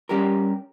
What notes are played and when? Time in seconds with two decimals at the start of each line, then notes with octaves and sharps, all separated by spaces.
0.09 G3 C#4 G4 A#4